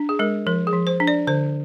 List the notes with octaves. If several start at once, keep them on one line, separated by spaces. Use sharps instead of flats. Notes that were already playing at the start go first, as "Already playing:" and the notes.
Already playing: D4
G#4
G#3 A#4
F3 A#4
G#4
F3
C5
D4
D5
D3 C5